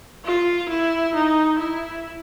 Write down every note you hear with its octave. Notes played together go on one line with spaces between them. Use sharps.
F4
E4
D#4
E4